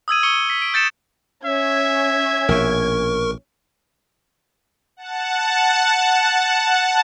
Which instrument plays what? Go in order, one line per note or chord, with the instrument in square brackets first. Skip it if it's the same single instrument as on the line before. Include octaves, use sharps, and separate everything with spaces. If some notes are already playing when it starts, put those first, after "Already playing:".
[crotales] D#6 E6 G#6 D#7
C#6 C#7 G7
B6
D7
G6 A6 C#7 E7
[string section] C#4 G#6 [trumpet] E5
[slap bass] A#1 B2 [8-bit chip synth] A#4 C#6
[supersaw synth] F#5 A5